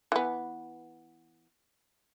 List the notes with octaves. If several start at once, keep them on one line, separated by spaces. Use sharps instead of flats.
E3 B3